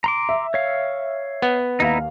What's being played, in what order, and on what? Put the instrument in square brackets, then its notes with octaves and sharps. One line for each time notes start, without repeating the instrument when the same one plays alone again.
[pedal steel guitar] A#5 C6 D6
[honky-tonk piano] E5
[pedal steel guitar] C#5 F5
[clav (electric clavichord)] B3
[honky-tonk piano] D#2 F5 [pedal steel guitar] D#4 E4 A#5